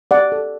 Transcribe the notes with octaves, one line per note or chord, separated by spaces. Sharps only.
G4 D5 F#5
A4